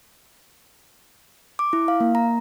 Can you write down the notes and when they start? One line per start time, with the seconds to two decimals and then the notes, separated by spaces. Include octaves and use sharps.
1.59 D6
1.73 E4
1.88 F5
2.00 A#3
2.15 A#5